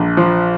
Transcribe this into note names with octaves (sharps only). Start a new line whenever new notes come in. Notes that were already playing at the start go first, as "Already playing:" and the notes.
Already playing: A#1
F3